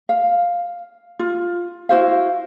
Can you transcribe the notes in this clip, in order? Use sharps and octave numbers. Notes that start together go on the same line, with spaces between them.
F5
F4
E4 F#4 C5 F5